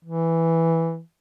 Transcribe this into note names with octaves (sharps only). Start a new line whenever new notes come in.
E3